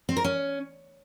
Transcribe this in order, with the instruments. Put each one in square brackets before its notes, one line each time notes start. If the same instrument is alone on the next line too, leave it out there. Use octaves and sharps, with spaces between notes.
[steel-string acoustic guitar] C4
A#4
C#4